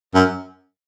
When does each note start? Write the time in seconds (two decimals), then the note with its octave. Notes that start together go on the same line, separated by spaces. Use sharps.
0.15 F#2